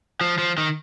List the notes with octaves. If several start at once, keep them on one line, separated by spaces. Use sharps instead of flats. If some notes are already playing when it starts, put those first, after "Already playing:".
F3
F3
D#3